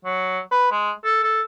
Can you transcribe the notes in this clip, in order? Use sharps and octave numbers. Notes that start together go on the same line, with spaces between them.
F#3
B4
G#3
A4
A4